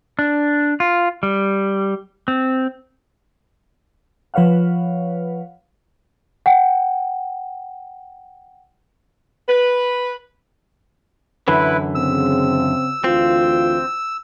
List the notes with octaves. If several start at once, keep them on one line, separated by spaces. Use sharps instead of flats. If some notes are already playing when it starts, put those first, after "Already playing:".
D4
F4
G3
C4
F3 B4 C#5 F5 F#5
F#5 G5
B4
F#2 D3 E3 E4 B4
C#3 C4 E6
D2 E3 C4 F4